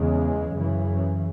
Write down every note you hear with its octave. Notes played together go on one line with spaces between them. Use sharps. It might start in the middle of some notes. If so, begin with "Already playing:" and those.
Already playing: E2 C#3 G#3
F#2 C#3 E3